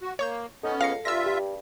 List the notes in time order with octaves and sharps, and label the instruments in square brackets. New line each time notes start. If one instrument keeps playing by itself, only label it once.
[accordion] F#4
[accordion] A#3 [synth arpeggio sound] C#5 C#6 G6
[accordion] B3 C#4 [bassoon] D#4 [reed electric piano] A4
[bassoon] C#2 [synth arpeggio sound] F5 A#6 C#7
[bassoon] G2 [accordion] F4 E5 [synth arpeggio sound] E6 A#6
[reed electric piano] G4